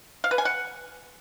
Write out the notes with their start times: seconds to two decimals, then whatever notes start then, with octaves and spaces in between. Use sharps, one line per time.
0.24 F5
0.31 B4
0.38 G#5
0.45 F#5